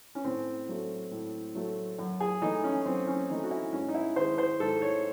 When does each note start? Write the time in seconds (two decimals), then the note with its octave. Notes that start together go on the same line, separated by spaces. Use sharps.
0.15 C#4
0.24 A2 C4
0.68 F#3 A3
1.11 A2
1.55 F#3 A3
1.98 F#2
2.20 G#4
2.42 E3 A3 D#4
2.64 C#4
2.85 F#2 C4
3.07 C#4
3.29 E3 A3 D#4
3.44 F#4
3.51 E4
3.72 G#2 C#4
3.88 D#4
3.94 E4
4.16 D#3 G#3 C5
4.38 C5
4.60 G#2 A4
4.82 C#5